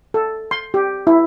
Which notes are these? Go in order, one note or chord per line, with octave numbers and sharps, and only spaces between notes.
A4
C6
G4
E4